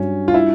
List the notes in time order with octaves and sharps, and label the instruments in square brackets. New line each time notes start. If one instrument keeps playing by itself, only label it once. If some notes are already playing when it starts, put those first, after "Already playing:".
Already playing: [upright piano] G2 F#3 [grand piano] C#4
[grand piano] F4
E4